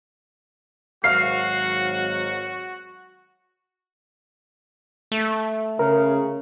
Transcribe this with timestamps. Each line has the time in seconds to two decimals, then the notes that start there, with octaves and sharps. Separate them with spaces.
1.04 G#1 F#3 F#4 F5 F6 C7
5.12 A3
5.79 C#3 A#4